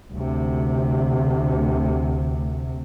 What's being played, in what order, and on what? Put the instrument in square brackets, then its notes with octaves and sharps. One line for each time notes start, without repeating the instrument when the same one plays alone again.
[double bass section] D2 C3